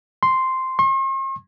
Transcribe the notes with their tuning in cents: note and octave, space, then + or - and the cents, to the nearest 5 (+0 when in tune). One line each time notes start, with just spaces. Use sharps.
C6 -5
C6 +45